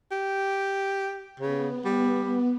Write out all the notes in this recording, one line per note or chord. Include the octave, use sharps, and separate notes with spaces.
G4
C#3 B3
G3